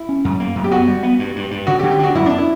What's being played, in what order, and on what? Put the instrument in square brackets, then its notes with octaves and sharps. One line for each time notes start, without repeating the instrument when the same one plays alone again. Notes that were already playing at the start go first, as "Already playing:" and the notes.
Already playing: [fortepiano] E4
[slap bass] C#4
F#2
A#3
F#2
[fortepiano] G4
[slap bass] B3 [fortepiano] F#4
[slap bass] G3
B3
G2
G2
G2
[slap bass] D3 [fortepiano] F#4
[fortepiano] G4
[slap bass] D3
[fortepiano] G4
[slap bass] D4 [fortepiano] F#4
[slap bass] F#2 [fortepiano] E4
[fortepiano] D4
E4